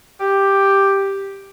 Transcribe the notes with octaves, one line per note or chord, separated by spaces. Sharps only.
G4